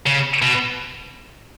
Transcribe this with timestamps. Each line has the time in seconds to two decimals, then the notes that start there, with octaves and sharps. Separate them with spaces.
0.06 C#3
0.42 B2